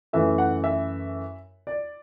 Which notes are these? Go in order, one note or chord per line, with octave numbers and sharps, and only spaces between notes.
F#2 E3 A3 E5
F#5
E5
D5